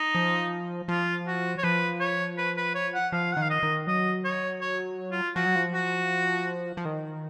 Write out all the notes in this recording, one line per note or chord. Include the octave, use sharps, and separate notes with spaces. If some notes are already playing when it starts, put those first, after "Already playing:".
Already playing: D#4
F3
F3 F4
F#4
C#5
F3 B4
C#5
B4
B4
C#5
F#5
F3 F5
F#5
D#3 F5
D#5
D#3
F#3 D#5
C#5
C#5
F4
F3 F#4
F#3
F3
F#4
F3
D#3